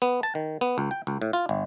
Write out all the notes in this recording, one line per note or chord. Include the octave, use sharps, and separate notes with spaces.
B3
A5
D#3
B3
C#2
G5
C#2
A2
F4
G1